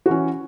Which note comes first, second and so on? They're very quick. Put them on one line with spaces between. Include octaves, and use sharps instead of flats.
F#4 E3 C#4